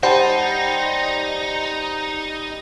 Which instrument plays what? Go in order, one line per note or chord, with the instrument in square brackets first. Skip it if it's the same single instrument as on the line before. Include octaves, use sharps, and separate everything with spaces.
[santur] G3 [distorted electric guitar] D#4 [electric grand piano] C5 A5 [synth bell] F#5